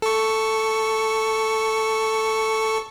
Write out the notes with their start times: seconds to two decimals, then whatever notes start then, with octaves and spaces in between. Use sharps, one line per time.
0.02 A4 C#6